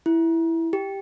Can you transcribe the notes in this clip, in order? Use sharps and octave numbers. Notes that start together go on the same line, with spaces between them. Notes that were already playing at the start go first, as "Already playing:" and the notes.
E4
G4